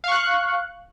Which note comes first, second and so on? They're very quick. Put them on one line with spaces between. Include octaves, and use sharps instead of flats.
F5 C#6 F#6